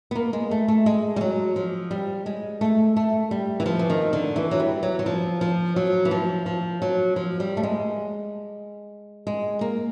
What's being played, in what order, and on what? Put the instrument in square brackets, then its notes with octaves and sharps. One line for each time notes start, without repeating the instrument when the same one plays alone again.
[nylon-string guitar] B3
A#3
G#3
A3
A3
G#3
G3
F#3
F3
G3
G#3
A3
A3
G3
E3
F3
E3
D#3
D3
E3
F#3
G3
F#3
F#3
F3
F3
F#3
E3
F3
F3
F#3
F3
G3
A3
G#3
G#3
A#3